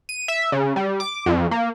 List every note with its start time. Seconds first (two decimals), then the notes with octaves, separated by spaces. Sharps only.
0.09 D#7
0.28 E5
0.52 C#3
0.76 G3
1.00 D6
1.26 F2
1.51 A#3